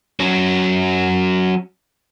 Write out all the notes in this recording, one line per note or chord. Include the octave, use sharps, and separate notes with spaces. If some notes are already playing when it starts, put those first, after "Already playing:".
F#3 C#4